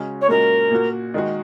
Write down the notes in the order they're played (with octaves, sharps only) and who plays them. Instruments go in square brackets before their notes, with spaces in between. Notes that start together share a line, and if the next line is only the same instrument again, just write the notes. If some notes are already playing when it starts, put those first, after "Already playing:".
Already playing: [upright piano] C#3 G#3 C#4 F#4
[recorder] C#5
[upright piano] A#2 G#3 C#4 F#4 [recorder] A#4
[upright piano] A#2 A#3 F#4
D#3 G#3 F#4